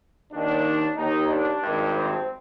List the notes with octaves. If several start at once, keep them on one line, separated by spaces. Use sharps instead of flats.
D#2 D#3 D4
D#2 D#3 D#4
D4
G#1 G2 D#3
C4